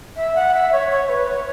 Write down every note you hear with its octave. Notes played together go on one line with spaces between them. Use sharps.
E5
F#5
E5
C#5
C#5
B4
C#5